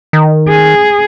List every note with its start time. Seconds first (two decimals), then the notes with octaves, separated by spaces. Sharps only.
0.13 D#3
0.49 G#4